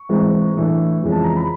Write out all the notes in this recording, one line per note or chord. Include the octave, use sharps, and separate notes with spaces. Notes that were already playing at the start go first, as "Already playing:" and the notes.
Already playing: C#6
G#2 E3 G#3 C4
A2 E3 A3 D4
F2 C#3 E3 G#3
A5
A#5
B5